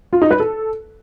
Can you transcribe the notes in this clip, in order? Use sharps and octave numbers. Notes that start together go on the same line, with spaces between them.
F4
D#4
B4
A4